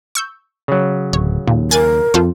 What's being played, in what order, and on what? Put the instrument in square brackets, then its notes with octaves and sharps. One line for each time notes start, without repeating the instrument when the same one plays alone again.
[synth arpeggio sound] C#6 E6 G6
[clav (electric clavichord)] C#3 F#3
[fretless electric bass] D1 [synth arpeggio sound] C#5
[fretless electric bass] D#2 [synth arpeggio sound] A#2
[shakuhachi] A#4 [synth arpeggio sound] G#5 F#6 A6
[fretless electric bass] F2 [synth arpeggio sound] F4 A4 C5